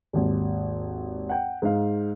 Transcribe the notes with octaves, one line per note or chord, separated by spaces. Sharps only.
G#1 D#2
F#5 G5
G#2 D#4 F5